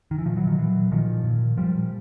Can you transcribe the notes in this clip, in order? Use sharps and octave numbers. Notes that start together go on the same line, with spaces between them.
D#3
E3
A#2 D#3 F3
E3 F#3
D#3 F3
A#2 E3 F#3
A#2 D#3 F3
A#2
A#2 F3 G3